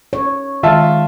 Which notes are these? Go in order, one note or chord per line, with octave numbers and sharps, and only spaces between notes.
C#5
D#3 G#3 F4 E5 A5